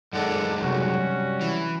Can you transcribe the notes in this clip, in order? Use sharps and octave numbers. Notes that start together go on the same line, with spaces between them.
F#2 D#3 G#3 A4 D5 F#5
C3 F#3 G3 C#4 F#4
E3